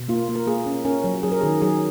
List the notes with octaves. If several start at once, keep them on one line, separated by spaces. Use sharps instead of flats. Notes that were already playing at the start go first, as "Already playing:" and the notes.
Already playing: B2
A#3 F4
A#3
A#4
A#3 G#4
C#4
C#4 A#4
F#3
F#3 G#4
A#4
D#3 G#4
F#3 G#4